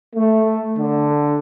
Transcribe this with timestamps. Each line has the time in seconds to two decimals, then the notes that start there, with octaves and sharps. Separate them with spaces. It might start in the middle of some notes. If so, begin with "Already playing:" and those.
0.16 A3
0.78 D3